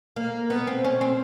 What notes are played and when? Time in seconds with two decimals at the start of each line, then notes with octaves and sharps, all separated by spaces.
0.16 A#3
0.50 B3
0.67 C4
0.84 C#4
1.01 C4